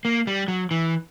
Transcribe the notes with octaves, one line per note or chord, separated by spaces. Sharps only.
A#3
G3
F#3
E3